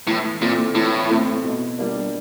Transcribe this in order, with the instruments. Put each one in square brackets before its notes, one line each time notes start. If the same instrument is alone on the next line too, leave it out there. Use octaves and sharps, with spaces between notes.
[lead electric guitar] A2 [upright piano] E3
[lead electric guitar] A#2 [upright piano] A3 C4
[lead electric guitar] A2 [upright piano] E3
[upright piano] A3 C4
B2
G3 A#3 D4